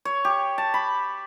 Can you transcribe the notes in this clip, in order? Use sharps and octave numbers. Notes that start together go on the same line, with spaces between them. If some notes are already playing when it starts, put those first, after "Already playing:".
C#5
G4
A5
B5